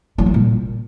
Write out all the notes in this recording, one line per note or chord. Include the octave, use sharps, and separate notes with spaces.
F#3
G3
A#2